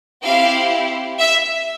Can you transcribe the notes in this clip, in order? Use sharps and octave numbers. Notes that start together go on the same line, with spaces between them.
C4 E4 G4 F5
E5